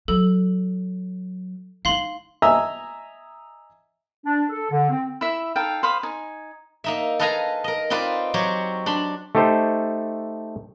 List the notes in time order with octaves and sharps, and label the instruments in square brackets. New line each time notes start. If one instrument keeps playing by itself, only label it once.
[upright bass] F#3 [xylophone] A4
[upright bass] D#4 E4 [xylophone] F5 C6 F#7
[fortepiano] D#5 E5 G#5 A#5 E6
[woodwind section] D4
A4
D3
C4
[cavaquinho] E4 E5
D#4 A4 F5 G5
C5 F5 B5 D#6
D#4 G#5
[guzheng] A#3 D#4 E5
A4 B4 D#5 F5 G#5 A#5
A#4 D#5
C4 D#4 F4 B4 D5
F#3 C4 G4 C#5
D4 B5 C6
[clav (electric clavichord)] A3 D#4 G4 A4 C5